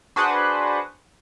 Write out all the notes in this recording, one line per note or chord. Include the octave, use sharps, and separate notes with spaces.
D4 F#4 G#4 B4 C5 F#5